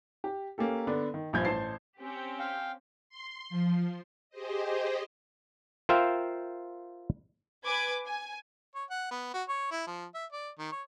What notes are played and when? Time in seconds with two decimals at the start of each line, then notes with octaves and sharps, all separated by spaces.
0.24 G4
0.58 A#3 C#4 G4 A4
0.87 D3 B3 D4
1.14 D#3
1.33 A#1 G2 F3 G6 G#6
1.45 A1 C5 A5 C7
2.00 C4 C#4 G4
2.39 F5 G5
3.09 C6
3.50 F3
4.30 G4 G#4 C5 D#5
5.89 F4 A#4 C5 E5 F5 G5
7.66 B4 G#5 D6 G#6
8.08 G#5
8.75 C#5
8.90 F#5
9.11 B3
9.34 F#4
9.48 C#5
9.71 E4
9.87 F3
10.14 E5
10.32 D5
10.58 D#3
10.72 C#5